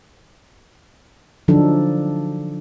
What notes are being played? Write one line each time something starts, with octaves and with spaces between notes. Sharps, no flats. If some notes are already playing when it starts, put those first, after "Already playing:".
D3 F3 F#3 D4 D#4 A4